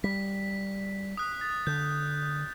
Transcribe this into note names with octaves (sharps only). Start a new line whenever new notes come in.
G3 B6
D#6 F#6
A6
D3 G6